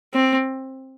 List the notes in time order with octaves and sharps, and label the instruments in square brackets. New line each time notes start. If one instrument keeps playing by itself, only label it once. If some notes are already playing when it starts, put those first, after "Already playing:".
[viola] C4